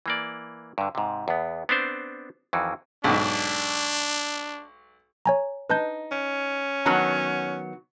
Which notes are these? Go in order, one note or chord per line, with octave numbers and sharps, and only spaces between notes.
E3 A#3 D5
G2 D3
G#2 C3
E2 B3
B3 C4 D4 C5
F2 D#3 E3 F#4
B1 G#2 D4
C#5 G#5 A#5
D#4 B4 A5 G6
C#4
D#3 F#3 B3 A5 A#5 F6